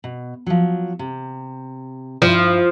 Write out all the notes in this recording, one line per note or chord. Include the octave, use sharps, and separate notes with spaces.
B2
F3 F#3
C3
G2 F3 E4